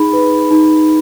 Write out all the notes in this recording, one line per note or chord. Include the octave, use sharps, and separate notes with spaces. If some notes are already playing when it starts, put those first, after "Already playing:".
Already playing: D#4 G#4 B5
B4
D#4